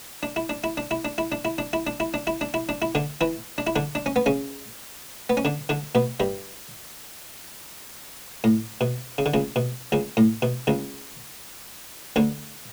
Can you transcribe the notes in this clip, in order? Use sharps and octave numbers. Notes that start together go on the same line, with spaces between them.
D4
E4
D4
E4
D4
E4
D4
E4
D4
E4
D4
E4
D4
E4
D4
E4
D4
E4
D4
E4
D3 D4
E3 E4
D4
E4
D3 D4
D4
C#4
B3
C#3 C#4
B3
C#4
D3 D4
D3 D4
B2 B3
G2 G3
A2
B2
C#3
D3
C#2 C#3
B2
C#2 C#3
A2
B2
C#2 C#3
D2 D3